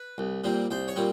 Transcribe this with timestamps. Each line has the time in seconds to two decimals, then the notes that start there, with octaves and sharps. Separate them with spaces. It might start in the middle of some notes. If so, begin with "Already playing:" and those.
Already playing: B4
0.18 C2
0.44 A#2 G3 C4
0.71 C2 C5
0.88 C#5
0.96 A#2 G3 C4